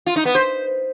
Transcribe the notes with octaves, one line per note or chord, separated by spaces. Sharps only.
F4
D#4
B3
C5